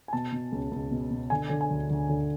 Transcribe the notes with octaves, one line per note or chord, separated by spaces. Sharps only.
G#5
B2 A5
B2
C#2
C#2
B2
B2
D3 G#5
D3
G#5
D2
D2
D3